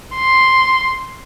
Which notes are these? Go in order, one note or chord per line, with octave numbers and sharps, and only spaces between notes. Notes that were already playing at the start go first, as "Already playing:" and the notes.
C6